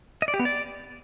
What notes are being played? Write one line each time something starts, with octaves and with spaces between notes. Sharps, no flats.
D#5
D5
G4
B3
D5